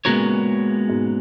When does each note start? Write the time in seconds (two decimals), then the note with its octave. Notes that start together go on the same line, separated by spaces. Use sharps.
0.05 A#2 C#3 G#3 B3 F#4 A#4 C#5
0.89 G#2 B2